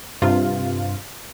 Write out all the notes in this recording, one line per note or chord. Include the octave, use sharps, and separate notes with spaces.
G2 C3 F4